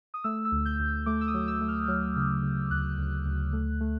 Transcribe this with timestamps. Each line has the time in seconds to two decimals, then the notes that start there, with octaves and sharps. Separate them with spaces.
0.14 D#6
0.24 A3 E6
0.45 E6
0.52 D2
0.65 G6
0.79 D2
1.06 A3 D6
1.21 E6
1.27 D#6
1.34 F#3
1.48 E6
1.61 A3
1.68 F6
1.88 F#3
2.16 C#3
2.43 C#3
2.71 D2 F#6
2.98 D2
3.25 D2
3.53 A3
3.81 A3